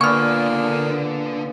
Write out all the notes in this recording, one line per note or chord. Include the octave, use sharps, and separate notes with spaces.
A#2 D3 A#3 B3 D4 G#5 C#6 F6